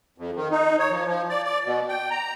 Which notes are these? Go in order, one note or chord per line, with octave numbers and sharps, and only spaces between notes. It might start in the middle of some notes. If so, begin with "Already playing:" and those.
F2
D#3
D#4
C#5
F3
F3
D5
D5
B2
G5
A#5